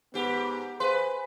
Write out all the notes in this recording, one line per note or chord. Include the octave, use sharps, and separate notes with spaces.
G#2 B3 G4
G#4 B4 C5 F5 C6